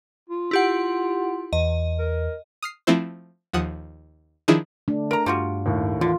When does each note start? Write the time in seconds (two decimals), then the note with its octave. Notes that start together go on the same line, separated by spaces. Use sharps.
0.29 F4
0.51 E4 G4 F#5
1.53 E2 D#5
1.99 A#4
2.62 D#6 F6 C7
2.87 F3 A3 C4 E4 C5
3.53 D#2 F3 F#5 D#6
4.48 D#3 F3 D4 E4 G#4
4.88 D3 A3 D4
5.11 A#4 A#5 D7
5.26 G2 G3 F4 F#4
5.66 D#2 A2
6.01 D3 E3 F4